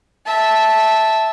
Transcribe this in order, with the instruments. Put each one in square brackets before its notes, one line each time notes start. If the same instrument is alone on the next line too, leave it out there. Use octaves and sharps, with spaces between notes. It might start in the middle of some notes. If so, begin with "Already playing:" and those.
[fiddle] E5 A5